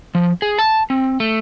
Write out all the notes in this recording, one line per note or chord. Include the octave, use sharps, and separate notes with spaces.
F3
G#4
A5
C4
A3